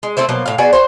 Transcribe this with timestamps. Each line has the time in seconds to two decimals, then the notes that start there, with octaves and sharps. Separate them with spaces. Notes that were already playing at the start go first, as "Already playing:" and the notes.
0.03 G#3
0.17 A3 C4 E4 C5
0.29 B2 F3 F#3 A#3
0.46 A2 F5
0.58 B3 F#4 G#4 D5
0.73 F#4 C5